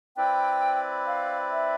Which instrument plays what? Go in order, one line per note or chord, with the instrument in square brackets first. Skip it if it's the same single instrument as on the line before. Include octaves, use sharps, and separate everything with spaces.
[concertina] C4 E4 B4 D5 [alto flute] G5
[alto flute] F5
E5